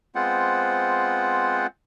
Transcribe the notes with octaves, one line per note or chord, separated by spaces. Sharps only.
G#3 B3 C4 F4 C5 F#5